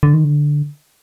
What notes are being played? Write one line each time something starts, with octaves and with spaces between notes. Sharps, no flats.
D3
D#3
D3